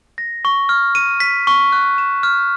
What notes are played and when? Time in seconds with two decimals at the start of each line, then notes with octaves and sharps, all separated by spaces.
0.18 A#6
0.45 C#6
0.69 F6
0.95 D#7
1.20 B6
1.47 C#6
1.72 F#6
1.98 E7
2.23 F6